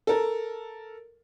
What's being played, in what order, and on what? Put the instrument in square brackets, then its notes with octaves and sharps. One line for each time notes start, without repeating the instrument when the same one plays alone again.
[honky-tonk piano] A4 A#4